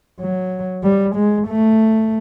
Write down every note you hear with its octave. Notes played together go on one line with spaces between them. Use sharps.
F#3
G3
G#3
A3